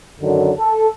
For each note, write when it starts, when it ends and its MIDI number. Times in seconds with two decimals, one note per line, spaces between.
0.21 0.51 42
0.21 0.51 50
0.21 0.51 51
0.21 0.51 54
0.58 0.87 69